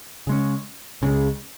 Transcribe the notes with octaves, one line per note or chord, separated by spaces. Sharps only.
C#3 G#3 C#4
C#2 C#3 G#3